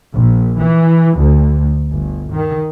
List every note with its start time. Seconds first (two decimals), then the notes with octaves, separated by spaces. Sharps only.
0.15 A#1
0.60 E3
1.19 D2
1.91 G1
2.32 D#3